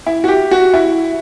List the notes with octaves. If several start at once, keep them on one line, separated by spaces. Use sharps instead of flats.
E4
F#4
G4
F#4
E4